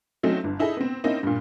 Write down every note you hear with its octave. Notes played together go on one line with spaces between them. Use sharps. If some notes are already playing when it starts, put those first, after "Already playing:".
F#3 A3 C4 C#4 D#4
G1
D#4 E4 G#4 A4 D#5
B3 C4
A#3 C4 C#4 D#4 E4
G2 A#2